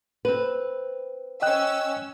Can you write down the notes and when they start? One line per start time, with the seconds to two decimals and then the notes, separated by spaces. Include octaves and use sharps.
0.25 C4 B4
1.42 C#4 D#5 G5 E6 F#6